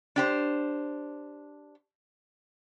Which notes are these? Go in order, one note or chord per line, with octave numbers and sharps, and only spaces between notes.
D4 G4 C5